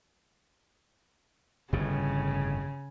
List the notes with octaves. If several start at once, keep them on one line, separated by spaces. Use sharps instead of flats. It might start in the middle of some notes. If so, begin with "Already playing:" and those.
G1 F2 A2 C#3